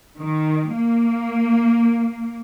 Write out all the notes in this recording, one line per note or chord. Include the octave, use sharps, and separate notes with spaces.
D#3
A#3